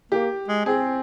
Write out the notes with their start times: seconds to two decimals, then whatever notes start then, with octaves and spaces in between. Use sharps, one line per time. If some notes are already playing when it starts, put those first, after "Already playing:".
0.12 A#3 G4
0.48 G#3
0.66 C4 G#4